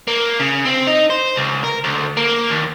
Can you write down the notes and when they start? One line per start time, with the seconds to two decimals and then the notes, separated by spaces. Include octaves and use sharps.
0.07 A#3
0.40 C#3
0.65 C4
0.87 D#4
1.10 C5
1.36 C#2
1.64 A#4
1.84 D2
2.17 A#3
2.51 D#2